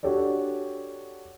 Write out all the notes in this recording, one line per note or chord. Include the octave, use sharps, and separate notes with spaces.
D4 F#4 G4 A4 C#5 D5